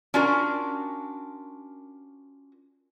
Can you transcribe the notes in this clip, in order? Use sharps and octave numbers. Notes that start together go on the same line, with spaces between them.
C#4 D4 F4 F#4 A#4